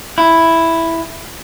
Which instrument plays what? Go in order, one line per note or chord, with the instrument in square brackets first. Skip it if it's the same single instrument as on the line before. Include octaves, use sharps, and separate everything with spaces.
[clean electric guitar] E4